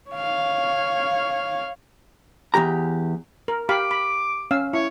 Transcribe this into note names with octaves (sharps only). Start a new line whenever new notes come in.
C#5 F5
E2 A#2 G4 A#5
A#4
G4 F5 B5 D6
B5
C#4 F5 E6
E4 C#5